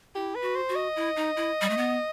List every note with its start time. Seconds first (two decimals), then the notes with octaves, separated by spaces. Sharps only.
0.15 E4 G4
0.35 B4
0.42 F#4
0.56 C5
0.69 F#4
0.75 D#5
0.96 E4
1.16 D#4
1.36 E4
1.61 G3
1.70 A3
1.77 B3